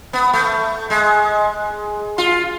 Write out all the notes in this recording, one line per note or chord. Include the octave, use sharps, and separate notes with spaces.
B3
A3
G#3
F4